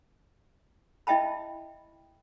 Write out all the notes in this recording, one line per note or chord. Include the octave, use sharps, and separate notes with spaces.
E4 D#5 E5 G5 A5 B5